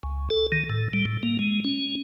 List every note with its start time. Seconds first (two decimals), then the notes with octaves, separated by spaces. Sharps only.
0.03 C#2
0.30 A4
0.52 D#3
0.70 A2
0.93 G3
1.05 A2
1.23 A#3
1.39 G#3
1.64 C#4